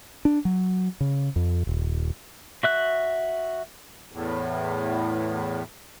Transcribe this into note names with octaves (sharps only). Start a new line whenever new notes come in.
D4
F#3
C#3
F2
D#1
F#4 E5 F#6
E2 A2